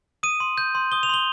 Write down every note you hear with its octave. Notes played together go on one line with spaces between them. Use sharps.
D#6 D#7
C6
G6
C6
D#6 G7
F7
C6 G7